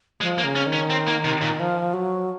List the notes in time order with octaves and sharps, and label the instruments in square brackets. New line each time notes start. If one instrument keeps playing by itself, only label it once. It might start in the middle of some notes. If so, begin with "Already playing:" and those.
[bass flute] F3 [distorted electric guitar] G#3
[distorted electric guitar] A#3
[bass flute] C#3
[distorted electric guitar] C#4
[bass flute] D#3
[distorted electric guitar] C#4
C4
A#3
C3
A#2
[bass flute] F3
F#3